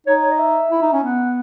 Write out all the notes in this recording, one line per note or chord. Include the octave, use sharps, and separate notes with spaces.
D#4 C#5
C#5
D#5
E5
E4
D#4
C#4
B3 F#5